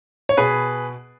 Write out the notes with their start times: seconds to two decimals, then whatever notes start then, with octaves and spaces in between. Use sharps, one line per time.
0.29 C#5
0.37 B2 G#4 B4